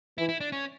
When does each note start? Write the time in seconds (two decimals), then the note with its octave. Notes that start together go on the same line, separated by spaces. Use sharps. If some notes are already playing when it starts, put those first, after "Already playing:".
0.18 E3 E4
0.29 E4
0.41 D4
0.52 C#4